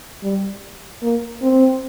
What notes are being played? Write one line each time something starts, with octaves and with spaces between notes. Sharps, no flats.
G3
A#3
C4